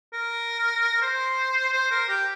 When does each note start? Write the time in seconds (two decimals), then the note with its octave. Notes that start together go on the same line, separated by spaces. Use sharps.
0.13 A#4
1.02 C5
1.73 C5
1.91 A#4
2.09 G4